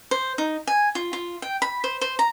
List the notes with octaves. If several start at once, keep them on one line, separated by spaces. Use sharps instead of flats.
C5
D#4
G#5
F4
F4
G5
B5
C5
C5
A#5